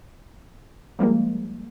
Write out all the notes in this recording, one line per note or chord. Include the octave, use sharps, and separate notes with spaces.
F3 G3 G#3 A#3